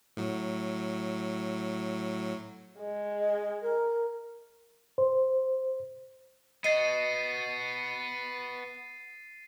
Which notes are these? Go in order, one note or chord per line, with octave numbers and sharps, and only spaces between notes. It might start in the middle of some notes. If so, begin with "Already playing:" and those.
A2 F#3
G#3
D#5
A#4
C5
B3 F#4 D#5 A6 C7 D#7